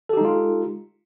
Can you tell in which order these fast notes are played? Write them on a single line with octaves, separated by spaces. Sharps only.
A4 G4 D#4 G#3 F4